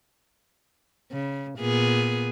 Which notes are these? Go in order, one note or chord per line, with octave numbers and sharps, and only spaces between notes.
C#3
A#2 B3 G#4